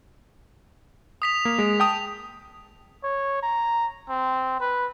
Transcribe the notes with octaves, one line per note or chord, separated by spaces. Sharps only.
D#6 B6 F7
A#3
G#3
G5 A5 D#6
C#5
A#5
C4
B4